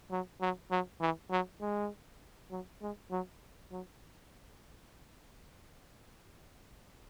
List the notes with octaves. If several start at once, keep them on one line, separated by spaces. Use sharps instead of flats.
F#3
F#3
F#3
E3
F#3
G#3
F#3
G#3
F#3
F#3